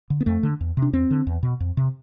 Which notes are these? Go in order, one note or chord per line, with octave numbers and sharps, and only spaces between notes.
D3
B3
F2 A3
D3
E2
C3
D4
E2 C4
D3
E2
B2
F2
C3